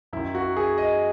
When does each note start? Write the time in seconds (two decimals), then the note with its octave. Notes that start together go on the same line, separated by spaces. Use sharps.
0.13 F#2 D#3 E4
0.35 F#4
0.57 G#4
0.78 D#5